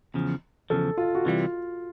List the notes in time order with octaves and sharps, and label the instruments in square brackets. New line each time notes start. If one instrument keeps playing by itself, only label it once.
[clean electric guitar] E2 C#3 F3
[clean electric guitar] E2 C#3 F3 [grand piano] A4
[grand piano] F4
F#4
[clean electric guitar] C3 E3 G3 [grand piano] F4